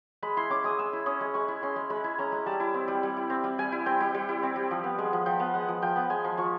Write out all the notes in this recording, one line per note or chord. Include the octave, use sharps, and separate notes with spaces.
G#3 B5
E4 C6
C#4 D6
G#3 D#6
G#3 E6
E4
C#4 D#6
G#3
G#3 C#6
E4
C#4 C6
G#3
G#3 B5
E4
C#4 A#5
G#3
G3 A5
E4
C4
G3
G3
E4
C4
G3
G3 G#5
E4
C4 G5
G3
G3
E4
C4
G3
F3
B3
G#3
F3
F3 G5
B3
G#3 F#5
F3
F3 G5
B3
G#3 G#5
F3
F3 C#6